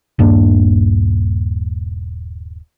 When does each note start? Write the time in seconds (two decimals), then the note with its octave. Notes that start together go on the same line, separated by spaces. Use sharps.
0.19 D#1 G2 A#3 D4